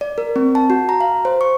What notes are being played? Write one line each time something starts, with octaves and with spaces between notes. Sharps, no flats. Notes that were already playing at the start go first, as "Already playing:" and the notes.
D5
A#4
C4
A5
F#4
A#5
F5
C5
C#6